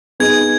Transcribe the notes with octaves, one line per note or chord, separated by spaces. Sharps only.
B3 D#4 G#4 G#6